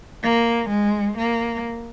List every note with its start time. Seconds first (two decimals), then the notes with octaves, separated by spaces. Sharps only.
0.23 A#3
0.69 G#3
1.17 A#3